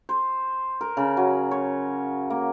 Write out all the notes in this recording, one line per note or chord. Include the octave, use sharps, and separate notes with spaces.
C5
A#4
C#3
F#3
C#5
A#3